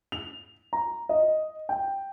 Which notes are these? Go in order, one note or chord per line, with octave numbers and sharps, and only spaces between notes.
F7
A#5
D#5
G5